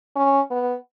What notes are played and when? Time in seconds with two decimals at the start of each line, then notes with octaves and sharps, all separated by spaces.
0.16 C#4
0.51 B3